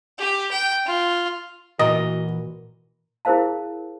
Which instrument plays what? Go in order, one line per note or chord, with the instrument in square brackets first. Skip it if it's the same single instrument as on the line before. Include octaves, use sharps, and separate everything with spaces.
[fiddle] G4
G5
F4
[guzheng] A#2 [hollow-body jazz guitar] E3 A#4 [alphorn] F#4 [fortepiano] D#5
[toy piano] E4 G#4 A#4 C5 F5 A5